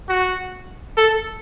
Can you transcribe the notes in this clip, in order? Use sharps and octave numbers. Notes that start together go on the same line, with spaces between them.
F#4
A4